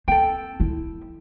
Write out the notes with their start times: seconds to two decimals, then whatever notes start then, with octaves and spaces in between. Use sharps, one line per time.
0.08 C4 A4 G5
0.60 F3 E4